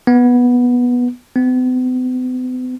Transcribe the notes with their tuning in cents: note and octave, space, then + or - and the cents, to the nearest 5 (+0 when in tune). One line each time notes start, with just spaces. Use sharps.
B3 -10
B3 +45